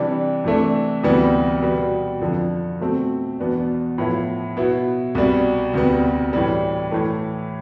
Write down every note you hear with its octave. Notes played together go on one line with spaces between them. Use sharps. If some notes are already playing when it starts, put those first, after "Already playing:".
Already playing: C3 E3 G3 D4
C3 E3 A3 D4
D2 C3 E3 G3 B3
B2 G3 B3
F2 D3 F3
B2 A3 C4
E2 B2 B3 D4
A2 F3 B3 E4
B2 B3 E4
C2 B2 G3
D2 C3 G3 B3
A2 E3 G3
A2 E3 A3